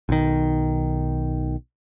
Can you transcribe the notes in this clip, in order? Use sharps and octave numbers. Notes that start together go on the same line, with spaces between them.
B1 D#3